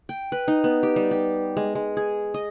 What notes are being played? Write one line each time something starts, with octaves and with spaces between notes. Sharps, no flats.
G5
B4
D#4
B3
G4
G3
G4
G#3
G#3
G#4
D#5